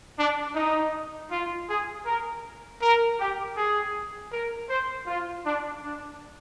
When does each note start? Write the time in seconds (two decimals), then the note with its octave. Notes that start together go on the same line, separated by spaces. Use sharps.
0.18 D4
0.55 D#4
1.31 F4
1.69 G#4
2.06 A#4
2.82 A#4
3.19 G4
3.57 G#4
4.32 A#4
4.70 C5
5.07 F4
5.44 D4
5.82 D4